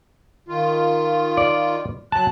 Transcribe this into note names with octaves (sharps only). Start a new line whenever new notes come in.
D#3 F4
D5
F#3 A5 F#6